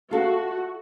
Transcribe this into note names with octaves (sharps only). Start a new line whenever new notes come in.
F4 F#4 A4 E5